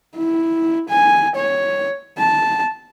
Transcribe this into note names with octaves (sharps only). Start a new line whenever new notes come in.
E4
G#5
C#5
A5